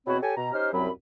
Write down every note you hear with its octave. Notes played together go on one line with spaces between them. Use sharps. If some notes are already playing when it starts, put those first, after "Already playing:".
E2 B2 C4 F#4 C#5 B5
G4 A4 C#5 G#5
B2 A#5
C#4 D#4 G4 C5 F6
C2 F#2 F#3 C4 B5